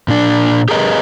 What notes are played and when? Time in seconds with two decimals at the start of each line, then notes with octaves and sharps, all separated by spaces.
0.08 A#2 D4
0.69 G4 G#4 A#4 B4 D#5